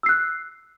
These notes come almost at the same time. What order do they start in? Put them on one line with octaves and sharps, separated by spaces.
E6 C7 F#6